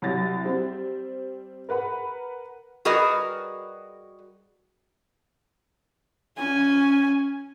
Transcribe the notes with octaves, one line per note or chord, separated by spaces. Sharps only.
C2 F#3 G4 A6 A#6
G3 C4
A#4 B4 F#5 B5
G3 F#4 G#4 A#4 B4 D#5
C#4 G#5